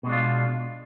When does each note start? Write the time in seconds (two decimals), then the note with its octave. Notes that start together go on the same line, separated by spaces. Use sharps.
0.03 B2
0.06 G#3
0.09 D4
0.12 F4